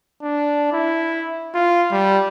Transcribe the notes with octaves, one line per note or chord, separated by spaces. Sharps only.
D4
E4
F4
G3